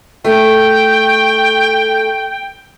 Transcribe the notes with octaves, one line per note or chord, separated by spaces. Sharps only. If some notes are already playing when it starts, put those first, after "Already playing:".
A3 G5